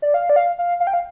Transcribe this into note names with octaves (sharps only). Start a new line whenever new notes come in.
D5
F5
D5
F5
F5
F5
G5
F5